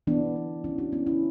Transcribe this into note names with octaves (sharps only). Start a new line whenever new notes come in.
E3 B3 D4
B3
E3 C#4 E4
D4 F#4
B3 C#4 E4
C#4 E4